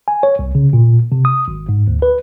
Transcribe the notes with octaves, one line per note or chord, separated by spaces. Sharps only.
G#5
C#5
C2
C#3
A#2
C3
D#6
G#1
G#2
D2
B4